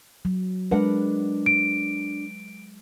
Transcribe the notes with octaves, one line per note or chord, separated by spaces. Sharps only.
F#3
G#3 D4 A#4 B4 F#5
D7